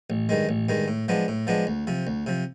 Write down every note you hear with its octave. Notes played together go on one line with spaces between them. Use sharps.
A1
G2 D#3 G#3
A1
G2 D#3 G#3
A2
F3 G#3 B3 D4
A2
F3 G#3 B3 D4
D2
C3 F3
D2
C3 F3